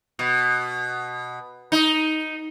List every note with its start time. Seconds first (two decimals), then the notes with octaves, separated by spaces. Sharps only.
0.19 B2
1.72 D#4